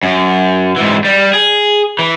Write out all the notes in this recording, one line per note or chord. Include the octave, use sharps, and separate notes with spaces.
F#2
G#2 E3
G3
G#4
E3